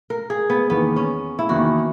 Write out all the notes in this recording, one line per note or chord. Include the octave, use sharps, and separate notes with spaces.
A#4
G#4
B3
E2 D#3 A#3 B3
C#4
E4
E2 D#3 A#3 F#4